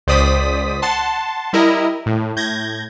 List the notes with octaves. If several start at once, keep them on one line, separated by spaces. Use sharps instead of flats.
C#2 C5 D5 D#6 B6 D#7
F#5 A5 C6
G3 E4 A#4 D#5
A2
A2 G6 G#6 A#6